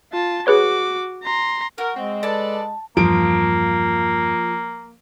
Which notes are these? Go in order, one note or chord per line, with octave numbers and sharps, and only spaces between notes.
F4 A5
F#4 G#4 B4 C#5 D6
A#5 C6
F#4 A#4
G#3 C4
A4 B4 D5 A5
E2 G2 F3 A#3 D7